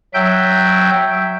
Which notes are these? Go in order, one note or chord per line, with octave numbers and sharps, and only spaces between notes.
F#3 E5 G5 G6